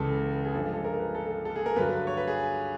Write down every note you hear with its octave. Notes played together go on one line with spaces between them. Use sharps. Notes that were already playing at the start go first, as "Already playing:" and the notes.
Already playing: C#2 C#3 E3 G#3 A4
G#4
G2 D3 F3 G#3 A4
G#4
A4
A#4
B4
A4
A4
G#4
A#4
G2 D3 F#3 B4
C#5
B4
G#4